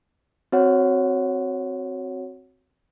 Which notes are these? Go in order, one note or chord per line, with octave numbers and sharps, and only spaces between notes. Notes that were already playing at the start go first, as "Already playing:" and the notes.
C4 F#4 C#5 F#5